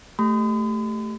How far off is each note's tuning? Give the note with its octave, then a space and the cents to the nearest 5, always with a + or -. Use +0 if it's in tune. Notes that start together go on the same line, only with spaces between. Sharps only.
A3 +0 G4 +0 B5 +45